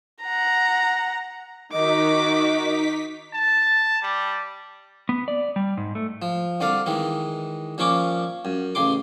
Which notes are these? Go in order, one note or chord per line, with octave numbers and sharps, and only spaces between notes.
F#5 A#5
D#3 D#4 F#4 D#5 D6 B6
A5
G3
B3
D5
G3
G#2
A3
F3
C2 D3 D5 F5
D#3 E3 G#3
A#2 F3 C#4 C#6 D6
F#2
A1 C#3 C6 D6